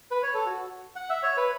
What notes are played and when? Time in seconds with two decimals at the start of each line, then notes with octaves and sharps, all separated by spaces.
0.11 B4
0.23 C#5
0.34 A4
0.46 F#4
0.96 F#5
1.10 E5
1.23 C#5
1.37 B4